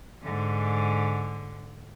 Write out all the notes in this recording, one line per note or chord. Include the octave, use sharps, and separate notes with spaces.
G#2 D3